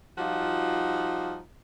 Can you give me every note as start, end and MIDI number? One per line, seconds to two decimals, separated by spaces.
0.18 1.39 53
0.18 1.39 55
0.18 1.39 63
0.18 1.39 65
0.18 1.39 66